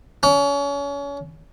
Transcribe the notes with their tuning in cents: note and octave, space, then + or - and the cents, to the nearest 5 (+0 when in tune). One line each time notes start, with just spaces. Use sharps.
C#4 +35